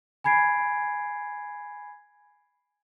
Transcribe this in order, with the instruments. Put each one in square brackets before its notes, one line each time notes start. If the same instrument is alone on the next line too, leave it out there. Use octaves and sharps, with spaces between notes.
[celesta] G#5 B5 G#6 C7 D7